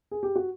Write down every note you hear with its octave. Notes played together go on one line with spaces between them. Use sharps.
G#4
G4
F#4